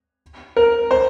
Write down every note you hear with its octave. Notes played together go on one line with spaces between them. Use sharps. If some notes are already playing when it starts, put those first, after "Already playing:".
A#4
C5